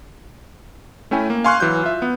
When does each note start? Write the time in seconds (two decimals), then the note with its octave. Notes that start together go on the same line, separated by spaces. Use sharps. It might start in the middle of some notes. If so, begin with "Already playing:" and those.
1.11 A3 C#4 E4 G5 G#5
1.30 A#3
1.44 F5 G#5 C6 C#6 F6 F#6
1.60 E3 F#3 G6
1.83 F4 E5
2.02 B3